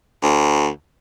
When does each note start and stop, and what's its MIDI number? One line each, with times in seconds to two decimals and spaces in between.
0.22 0.68 38